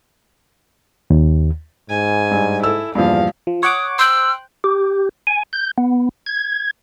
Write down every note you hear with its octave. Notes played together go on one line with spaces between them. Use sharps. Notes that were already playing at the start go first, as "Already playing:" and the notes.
D#2
G#2 G#5
G2
E4 A4 E6
E2 G2 A#2 F3 F5
F3
C#5 F#5 D6 D#6
C5 G5 E6 F#6
G4
G#5
G6
B3
G#6